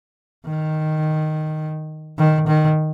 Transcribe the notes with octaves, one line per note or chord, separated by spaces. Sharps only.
D#3
D#3
D#3